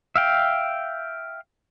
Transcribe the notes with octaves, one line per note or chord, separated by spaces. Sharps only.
E5 F5 G5